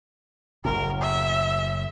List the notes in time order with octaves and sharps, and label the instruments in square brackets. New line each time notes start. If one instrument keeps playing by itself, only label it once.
[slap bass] F#1 F#2 A2 [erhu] A#4
[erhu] E5